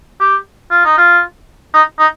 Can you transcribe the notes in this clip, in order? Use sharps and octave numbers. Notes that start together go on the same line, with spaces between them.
G4
F4
D#4
F4
D#4
D#4